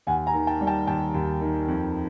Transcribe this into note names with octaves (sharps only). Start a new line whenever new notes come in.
D#2 F#5 G#5
G#5 A#5
D#3
G5 A5
G3
G5 A5
D#2 G5 A5
D#2
D#3
F2